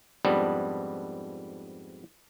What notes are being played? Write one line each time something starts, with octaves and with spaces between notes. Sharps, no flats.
F2 G#2 G3 B3 D4